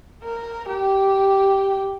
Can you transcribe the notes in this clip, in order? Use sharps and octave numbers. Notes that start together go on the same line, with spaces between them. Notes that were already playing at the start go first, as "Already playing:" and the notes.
A#4
G4